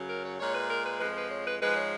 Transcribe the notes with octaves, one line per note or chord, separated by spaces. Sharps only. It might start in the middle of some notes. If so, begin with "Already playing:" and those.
Already playing: F#2 C#3 F#3
A#4
C#5
A#2 G#3 C#5
B4
A#4
B4
F2 F3 G#3 B4
B4
C#5
B4
G#2 F3 G#3 B4
C#5